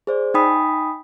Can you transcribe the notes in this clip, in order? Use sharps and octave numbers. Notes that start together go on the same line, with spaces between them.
G#4 C5 D5
D#4 G5 G#5 B5 D#6 B6